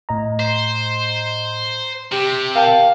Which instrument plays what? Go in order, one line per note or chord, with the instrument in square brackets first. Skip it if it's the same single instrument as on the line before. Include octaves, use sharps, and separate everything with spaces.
[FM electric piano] A2 D#5 A#5
[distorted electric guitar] C5
[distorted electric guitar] C3 [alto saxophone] G4
[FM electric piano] A#4 G5 A5 [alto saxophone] F5